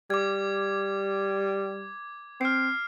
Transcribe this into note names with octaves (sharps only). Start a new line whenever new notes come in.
G3 D6 G#6
C4 F6 C7